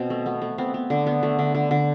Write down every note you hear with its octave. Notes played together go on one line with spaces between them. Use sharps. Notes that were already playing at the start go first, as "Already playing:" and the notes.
Already playing: B2 C4
A3
A3 B3
A3
B3 C4
B3
D3
B3
A3
D3
D3
D3